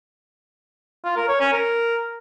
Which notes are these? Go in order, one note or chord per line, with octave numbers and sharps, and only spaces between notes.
F4
A#4
C#5
C#4
A#4